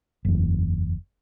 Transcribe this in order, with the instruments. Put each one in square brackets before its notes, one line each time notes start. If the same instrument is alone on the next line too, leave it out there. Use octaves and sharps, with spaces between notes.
[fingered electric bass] F#1 E2